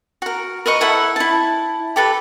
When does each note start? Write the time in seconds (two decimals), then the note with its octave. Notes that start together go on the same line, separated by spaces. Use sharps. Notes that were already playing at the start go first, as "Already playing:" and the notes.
0.22 F#4 A#4
0.66 A#4 B4 D#5 C#6
0.81 E4 A4 F#5
1.16 E4 A5
1.96 G4 A4 B4